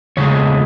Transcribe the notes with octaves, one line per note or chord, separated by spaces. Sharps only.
E2 C#3 E3 G#3 C#5